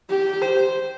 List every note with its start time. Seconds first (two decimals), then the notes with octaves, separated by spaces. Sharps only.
0.10 G4
0.42 C5